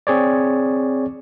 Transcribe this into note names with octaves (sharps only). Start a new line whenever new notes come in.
C4 G#4 C#5 D5